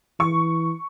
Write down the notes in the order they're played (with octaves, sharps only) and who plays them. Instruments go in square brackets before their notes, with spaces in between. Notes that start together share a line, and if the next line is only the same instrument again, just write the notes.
[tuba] E3 [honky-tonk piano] C#6